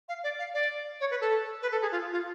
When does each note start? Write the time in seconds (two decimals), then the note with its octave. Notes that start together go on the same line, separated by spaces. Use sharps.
0.08 F5
0.23 D5
0.39 F5
0.54 D5
1.00 C#5
1.10 B4
1.21 A4
1.62 B4
1.71 A4
1.82 G#4
1.92 F4
2.12 F4